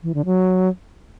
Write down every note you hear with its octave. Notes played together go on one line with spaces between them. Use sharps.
E3
D3
F#3